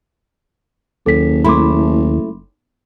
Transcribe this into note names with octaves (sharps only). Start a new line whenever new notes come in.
F#1 D#2 A4 B6
A3 E4 B5 C6 D6